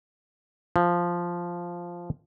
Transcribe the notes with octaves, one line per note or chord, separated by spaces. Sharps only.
F3